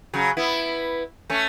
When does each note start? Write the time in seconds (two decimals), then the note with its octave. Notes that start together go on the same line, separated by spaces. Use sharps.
0.14 C#3 F#3
0.37 B3 E4
1.30 A3 C#4